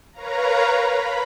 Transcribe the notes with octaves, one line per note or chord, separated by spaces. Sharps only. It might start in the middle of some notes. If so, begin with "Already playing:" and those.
A#4 B4 C#5 F5 A#5
B5